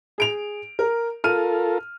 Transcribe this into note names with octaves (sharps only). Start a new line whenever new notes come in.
G#4 D7 F7
A#4
F4 A4 A#4 F6 D#7